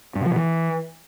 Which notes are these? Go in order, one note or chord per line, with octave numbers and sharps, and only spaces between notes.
G2
C3
F3
B2
E3